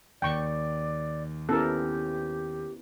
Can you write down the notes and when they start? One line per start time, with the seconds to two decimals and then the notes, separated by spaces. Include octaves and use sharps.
0.22 D#2 D5 G5 C#6
1.49 B3 C#4 E4 G4 A4 A#4